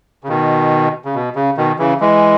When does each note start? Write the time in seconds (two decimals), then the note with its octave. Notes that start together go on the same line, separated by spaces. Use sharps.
0.24 C#3
0.28 B2 D#3
1.05 C#3
1.14 B2
1.36 C#3
1.57 B2 D#3
1.79 C#3 E3
2.00 E3 G#3